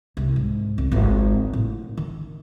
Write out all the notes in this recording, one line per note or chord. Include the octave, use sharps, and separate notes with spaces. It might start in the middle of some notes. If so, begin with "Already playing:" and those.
C2
G#2
C2
G#1 F4
A2
D#3